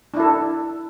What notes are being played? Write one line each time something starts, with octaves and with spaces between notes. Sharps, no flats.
D4 E4 A4